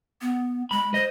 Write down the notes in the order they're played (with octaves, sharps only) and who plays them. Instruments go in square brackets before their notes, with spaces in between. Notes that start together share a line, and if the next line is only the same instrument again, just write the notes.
[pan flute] B3
[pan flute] G#3 [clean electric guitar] B5
[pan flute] C5 [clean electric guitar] D#5